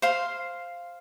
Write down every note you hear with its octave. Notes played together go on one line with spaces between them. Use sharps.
C5 F5 C6